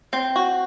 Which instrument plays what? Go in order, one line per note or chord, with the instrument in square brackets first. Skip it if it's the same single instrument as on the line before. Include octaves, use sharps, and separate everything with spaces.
[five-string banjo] C4
F#4